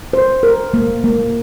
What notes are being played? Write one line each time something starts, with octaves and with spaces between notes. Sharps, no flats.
C5
A#4
A#3
A#3